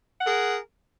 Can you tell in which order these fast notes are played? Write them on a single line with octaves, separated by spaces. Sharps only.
F#5 A#4 G#4